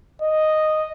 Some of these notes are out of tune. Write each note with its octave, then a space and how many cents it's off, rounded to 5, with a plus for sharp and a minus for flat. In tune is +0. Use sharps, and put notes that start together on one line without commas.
D#5 -5